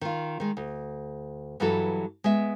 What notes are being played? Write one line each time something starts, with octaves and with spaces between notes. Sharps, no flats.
D#3 F4
D#3 G#3
D2
G2 E3 F#3 G3 F#4 A4
G#3 B3 E5